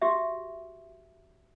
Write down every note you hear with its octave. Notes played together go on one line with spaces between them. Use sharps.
F#4 G4 E5